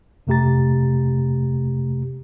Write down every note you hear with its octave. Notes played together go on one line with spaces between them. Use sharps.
F2 C3 A3 G4 A#5 A6